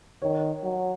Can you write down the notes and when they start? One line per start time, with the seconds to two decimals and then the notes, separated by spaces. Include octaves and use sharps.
0.22 D#3 C#5
0.64 F#3